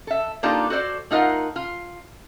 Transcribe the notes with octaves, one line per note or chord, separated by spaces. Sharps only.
A4 E5
A#3 D4 D#4 F4 G4 A4
F#4 A4 C5 D5
A3 D#4 F4 A#4 F#5
F4